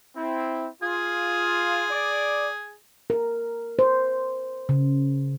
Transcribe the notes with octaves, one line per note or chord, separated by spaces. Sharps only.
C4 E4
F4 G#4
D5
A#4
C5
C#3